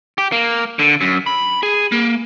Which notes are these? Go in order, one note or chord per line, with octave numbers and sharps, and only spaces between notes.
G4
A#3
D3
F#2
B5
G#4
A#3